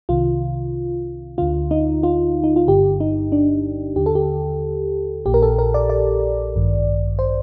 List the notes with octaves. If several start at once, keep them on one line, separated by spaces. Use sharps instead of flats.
C2 C3 D#3 F4
D2 D3 F4
D#4
F4
D#4
F4
G1 G2 D3 G4
D#4
D4
D#2 D3 G4
A4
G4
A#1 A#2 G4
A#4
A4
A#4
D5
D5
A1 G2 D#3
C5